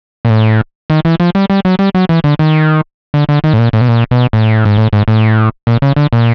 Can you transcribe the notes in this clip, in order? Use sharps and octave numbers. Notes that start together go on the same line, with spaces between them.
A#2
A2
D#3
E3
F3
G3
G3
F#3
G3
F#3
E3
D3
D#3
D3
D3
D#3
A2
A#2
A2
B2
A#2
B2
A2
G#2
A2
G#2
A2
A#2
C#3
D3
A#2